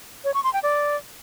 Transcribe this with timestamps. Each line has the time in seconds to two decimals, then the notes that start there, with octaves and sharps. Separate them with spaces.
0.24 C#5
0.34 C#6
0.44 C6
0.53 G5
0.63 D5